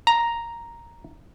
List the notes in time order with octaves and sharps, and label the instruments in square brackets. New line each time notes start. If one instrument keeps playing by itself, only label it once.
[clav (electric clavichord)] A#5